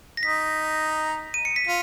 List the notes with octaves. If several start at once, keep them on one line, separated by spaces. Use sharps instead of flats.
A#6
D#4 B6
D#7
C#7
B6
F4